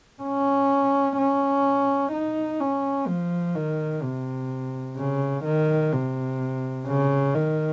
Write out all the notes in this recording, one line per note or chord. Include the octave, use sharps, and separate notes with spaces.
C#4
C#4
D#4
C#4
F3
D#3
C3
C#3
D#3
C3
C#3
D#3